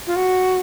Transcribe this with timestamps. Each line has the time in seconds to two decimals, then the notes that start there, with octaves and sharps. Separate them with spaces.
0.07 F4
0.16 F#4